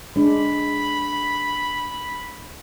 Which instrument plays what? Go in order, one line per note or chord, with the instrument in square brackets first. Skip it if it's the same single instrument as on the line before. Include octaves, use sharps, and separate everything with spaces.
[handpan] G#3 D4 [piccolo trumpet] B5